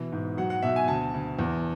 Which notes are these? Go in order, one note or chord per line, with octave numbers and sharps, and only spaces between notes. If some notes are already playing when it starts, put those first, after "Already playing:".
Already playing: B2 E3
G#2
F#3 F#5
F#5
B2 E5
G#5
D2 A5
D2
E2